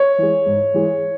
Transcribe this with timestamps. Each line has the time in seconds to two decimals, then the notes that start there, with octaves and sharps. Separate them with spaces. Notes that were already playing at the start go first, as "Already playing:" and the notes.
Already playing: C#5
0.18 E3 G#3
0.46 G#2
0.74 E3 G#3